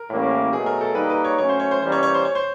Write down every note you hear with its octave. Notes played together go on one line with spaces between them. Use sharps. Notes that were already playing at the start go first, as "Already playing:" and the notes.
Already playing: A#4
A2 E3 G3 A#3 C#4
B2 F#3 A3 G#4
A#4
A4
G3 A#3 D#4 B4
B4
C#5
F#3 A3 C#4 C#5
C5
C#5
C5
E3 G3 A#3 C#4 C5
C#5
C#5
C5
C#5
C5